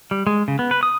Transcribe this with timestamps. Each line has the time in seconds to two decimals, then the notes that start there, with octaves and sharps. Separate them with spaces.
0.11 G3
0.27 G#3
0.48 C#3
0.59 B3
0.71 B4
0.83 D#6